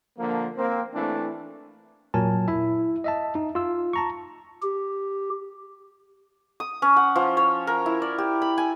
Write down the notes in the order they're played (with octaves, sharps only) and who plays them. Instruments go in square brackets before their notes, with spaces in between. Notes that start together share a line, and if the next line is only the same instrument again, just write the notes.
[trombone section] D3 F3 A#3
A#3 C4
E3 A3 C4 D4 E4
[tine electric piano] A#2 F#3 A#4 G#5 A5
E4 E5
D#5 E5 A5
D#4
F4 E6
A5 A#5 C#6
[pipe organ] G4
[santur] D#6
C#4
F#5
F3
C#5
A#4
E4
D5
G4
B5
G#5